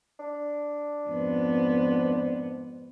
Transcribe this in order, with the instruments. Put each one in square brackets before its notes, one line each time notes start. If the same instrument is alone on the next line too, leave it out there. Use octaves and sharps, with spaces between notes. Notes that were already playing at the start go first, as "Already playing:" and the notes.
[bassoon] D4
[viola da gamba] F2 G#2 B3